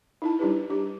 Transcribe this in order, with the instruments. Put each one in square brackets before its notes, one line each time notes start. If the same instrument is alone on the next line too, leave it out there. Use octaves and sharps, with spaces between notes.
[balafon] D#4 E4 A5
G3 D4 E4 G4 B4
D4 G4